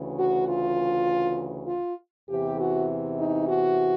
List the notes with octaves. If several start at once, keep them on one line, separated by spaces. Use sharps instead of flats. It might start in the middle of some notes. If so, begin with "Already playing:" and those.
Already playing: D2 C#3 E3
F#4
F4
F4
E2 C3 E3 G4
F#4
D#4
F#4